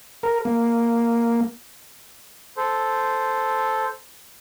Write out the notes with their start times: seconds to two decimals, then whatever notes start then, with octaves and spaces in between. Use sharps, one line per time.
0.23 A#4
0.45 A#3
2.57 A4 C5